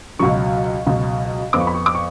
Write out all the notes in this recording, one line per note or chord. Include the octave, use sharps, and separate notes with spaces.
C#2 B2 F#3 C#6
C#2 B2 F#3
F2 F3 B3 D6
C#6
B5
C#6
D6
C#6